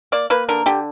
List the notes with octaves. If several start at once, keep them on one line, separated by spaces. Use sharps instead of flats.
A#3 D5
A#3 B4
D3 A#4
D3 G4